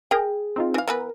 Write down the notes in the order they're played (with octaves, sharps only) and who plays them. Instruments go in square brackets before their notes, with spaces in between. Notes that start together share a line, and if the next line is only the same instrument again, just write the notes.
[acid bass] G#4 [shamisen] A#4 G5
[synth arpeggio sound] C4 D#4 F4
[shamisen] E3 F5
[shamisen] E3 B3 B4 [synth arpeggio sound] A#4